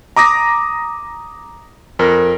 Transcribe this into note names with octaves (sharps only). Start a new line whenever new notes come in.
A#5 D6 D#6 A#6
F2 A#4